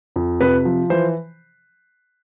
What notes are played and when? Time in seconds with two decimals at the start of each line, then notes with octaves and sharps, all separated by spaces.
0.16 F2
0.40 C3 B4
0.65 F3
0.90 E3 C5